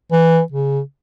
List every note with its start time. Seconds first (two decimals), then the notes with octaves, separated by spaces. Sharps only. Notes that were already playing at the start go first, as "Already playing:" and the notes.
0.12 E3
0.52 C#3